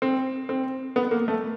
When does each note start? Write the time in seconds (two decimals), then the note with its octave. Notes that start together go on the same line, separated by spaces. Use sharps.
0.02 C4
0.49 C4
0.96 B3
1.11 A#3
1.28 A3